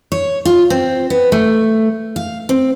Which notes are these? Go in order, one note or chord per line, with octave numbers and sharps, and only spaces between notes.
C#5
F4
C4
B3
A3
F5
C4